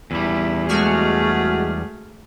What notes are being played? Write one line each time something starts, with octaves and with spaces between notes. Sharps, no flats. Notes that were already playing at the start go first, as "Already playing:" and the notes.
E2 G3 E4
G#3 A3 F#4 G#4 F6